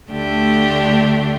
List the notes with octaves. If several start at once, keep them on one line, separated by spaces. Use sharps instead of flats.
D2 D3 A3 D4 G4